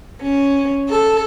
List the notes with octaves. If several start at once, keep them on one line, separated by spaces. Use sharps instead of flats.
C#4
A4